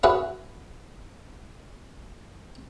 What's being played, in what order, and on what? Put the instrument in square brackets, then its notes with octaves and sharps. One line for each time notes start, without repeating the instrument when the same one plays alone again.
[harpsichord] E4 F#4 G#4 B4 C#5 F#5